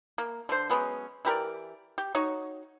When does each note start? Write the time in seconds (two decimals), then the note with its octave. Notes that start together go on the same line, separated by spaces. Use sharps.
0.18 A#3
0.49 D3 C5
0.70 F#3 G#3 B3 C#4
1.25 E3 G4 A#4 D5
1.98 G4
2.15 D#4 F#4 C#5